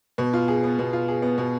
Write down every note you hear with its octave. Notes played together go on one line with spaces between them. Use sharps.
B2
F4
G#4
B3
B2
F4
G#4
B3
B2